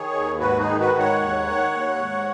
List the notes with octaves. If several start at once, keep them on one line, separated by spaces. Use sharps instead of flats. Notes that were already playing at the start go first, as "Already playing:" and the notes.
Already playing: D#3 G#4 C#5
D#2
G#2 F#4 B4
D#4 G#4
D#3
F#4 B4
G#2
C#5 F#5
D#2
D#3
D#2
G#2